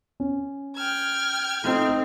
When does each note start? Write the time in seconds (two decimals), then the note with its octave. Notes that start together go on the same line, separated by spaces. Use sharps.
0.20 C#4
0.76 G5 F6 G#6
1.63 A3 C4 D#4